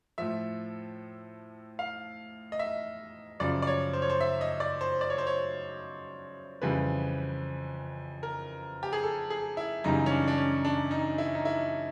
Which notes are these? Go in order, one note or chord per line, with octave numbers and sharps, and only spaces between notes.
A2 F3 E5
F5
D#5
E5
F#2 C#3 F3 D5
D5
C#5
C5
C#5
C5
E5
D#5
D5
C5
D5
C#5
C5
C#5
F2 C#3 E3 G3 B4
A#4
G4
G#4
A4
G#4
E4
F#2 C#3 E3 G3 D#4
C#4
D4
D4
C#4
D4
D#4
E4
D#4
E4